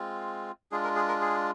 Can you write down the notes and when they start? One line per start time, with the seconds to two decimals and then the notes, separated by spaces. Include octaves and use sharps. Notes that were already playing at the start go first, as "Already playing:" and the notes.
Already playing: G#3 C4 F4
0.71 G#3 D4 F4 G#4
0.84 A#4
0.96 G#4
1.08 A#4
1.21 G#4